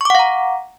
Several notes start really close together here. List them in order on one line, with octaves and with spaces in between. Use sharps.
C#6 D6 F#5 F5 A#5